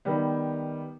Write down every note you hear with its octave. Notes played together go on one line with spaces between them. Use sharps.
D#3 G3 B3